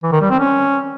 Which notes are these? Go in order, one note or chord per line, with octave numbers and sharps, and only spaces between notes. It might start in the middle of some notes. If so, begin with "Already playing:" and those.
E3
D#3
G3
C4
C#4